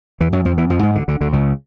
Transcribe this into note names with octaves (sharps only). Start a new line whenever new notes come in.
E2 E3
F#2 F#3
F2 F3
E2 E3
F2 F3
G#2 G#3
D2 D3
D2 D3
D2 D3
C#2 C#3